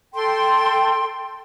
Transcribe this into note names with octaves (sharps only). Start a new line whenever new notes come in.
A4 G5 C6